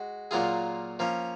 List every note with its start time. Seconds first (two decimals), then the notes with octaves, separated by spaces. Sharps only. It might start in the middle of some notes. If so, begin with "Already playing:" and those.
Already playing: G#3 F#4
0.31 A#2 F#3 A#3 F4 G#4
0.99 F3 A#3 C#4